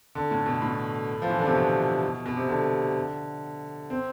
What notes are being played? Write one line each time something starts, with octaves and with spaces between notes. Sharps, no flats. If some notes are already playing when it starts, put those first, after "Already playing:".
D3
A2
B2
A2
F3
E3
D3
C3
B2
B2
C3
D3
C4